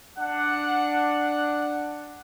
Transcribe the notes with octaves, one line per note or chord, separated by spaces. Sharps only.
D4 F#5